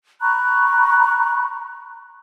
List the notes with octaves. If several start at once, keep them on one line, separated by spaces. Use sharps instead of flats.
A#5 B5 C#6 F#6